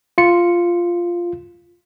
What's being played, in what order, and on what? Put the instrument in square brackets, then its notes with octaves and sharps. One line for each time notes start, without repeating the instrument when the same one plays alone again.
[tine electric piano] F4 C#7